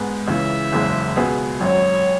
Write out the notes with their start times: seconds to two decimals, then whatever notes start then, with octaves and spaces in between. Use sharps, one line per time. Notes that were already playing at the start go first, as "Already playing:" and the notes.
Already playing: G#2 G#3 B3 G#4
0.28 C#2 C#3 E3 E5
0.72 F#1 E2 C#3 G#3
1.16 C#2 B2 B3 G#4
1.60 G#1 F#2 F#3 C#5